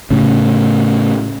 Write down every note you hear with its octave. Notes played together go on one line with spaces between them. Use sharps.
A2 C#3